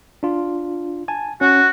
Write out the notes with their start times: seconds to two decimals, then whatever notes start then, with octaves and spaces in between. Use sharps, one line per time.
0.23 D4 F4
1.08 G#5 A5
1.41 C#4 F#4